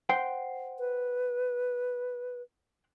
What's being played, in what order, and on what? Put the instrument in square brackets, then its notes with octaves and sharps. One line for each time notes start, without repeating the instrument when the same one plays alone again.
[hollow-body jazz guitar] C5 F#5 G5
[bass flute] B4